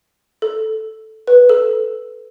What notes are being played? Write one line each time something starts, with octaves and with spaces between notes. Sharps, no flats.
A4
B4
A4